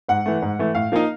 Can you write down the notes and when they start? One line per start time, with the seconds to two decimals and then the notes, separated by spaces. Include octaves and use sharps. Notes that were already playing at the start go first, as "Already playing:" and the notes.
0.08 G#2 F#5
0.26 E3 A3
0.42 G#2
0.59 E3 A3
0.75 A2 F5
0.92 F3 A#3 D#4